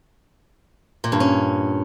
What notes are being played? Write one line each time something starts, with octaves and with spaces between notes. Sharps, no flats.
A#2
G2
C#4